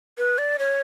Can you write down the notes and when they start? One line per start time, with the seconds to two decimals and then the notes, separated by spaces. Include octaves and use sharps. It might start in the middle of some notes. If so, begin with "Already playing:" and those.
0.18 B4
0.38 D5
0.59 C#5